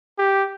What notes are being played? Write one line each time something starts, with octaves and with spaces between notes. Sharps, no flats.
G4